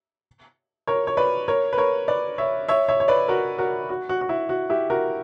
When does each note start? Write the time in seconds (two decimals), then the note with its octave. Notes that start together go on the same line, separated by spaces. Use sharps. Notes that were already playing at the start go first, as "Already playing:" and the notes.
0.87 A#4 C#5
1.07 C#5
1.17 B4 D5
1.48 A#4 C#5
1.73 B4
1.78 A#4 C#5
2.08 B4 D5
2.38 C#5 E5
2.68 C#5 E5
2.88 C#5 E5
3.00 C#5
3.08 B4 D5
3.28 F#4 A#4
3.58 F#4 A#4
3.89 F#4
4.09 F#4
4.21 F#4
4.29 E4
4.49 F#4
4.70 E4 G4
4.90 F#4 A#4